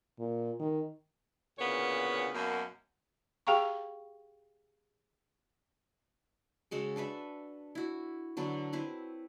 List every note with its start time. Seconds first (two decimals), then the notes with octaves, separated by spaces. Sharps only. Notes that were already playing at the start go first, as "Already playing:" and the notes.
0.19 A#2
0.60 D#3
1.58 D2 A#2 C#3 B3 C#5
2.34 F#2 B2 F#3 A#3
3.47 G4 G#4 F5 G5 A#5 C#6
6.71 C#3 G#3 F#4 A4
6.96 D4 A4 B4 E5
7.75 E4 F#4
8.37 D3 F#3 A4 B4
8.73 C4 E4 B4 C5